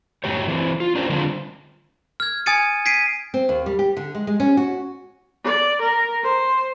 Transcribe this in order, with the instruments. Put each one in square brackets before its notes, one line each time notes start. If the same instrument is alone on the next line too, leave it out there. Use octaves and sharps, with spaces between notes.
[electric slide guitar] F#2 A2 F#3 G#3 G4 C#5
E3 C4
F4
C#4 D4 F4 G4 A#4 C5
D3 G3 G#3 C4 D4 F4
[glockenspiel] F6 G#6
G#5 D#6 G#6 A6 C#7 D#7
G#6 B6 C7 D7 D#7
[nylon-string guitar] C4
D#2
G3
G4
D3
G#3
G#3
C#4
F#4
[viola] D5
A#4
C5